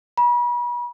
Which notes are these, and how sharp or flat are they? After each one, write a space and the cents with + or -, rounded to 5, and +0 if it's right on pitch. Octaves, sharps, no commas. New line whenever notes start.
B5 -40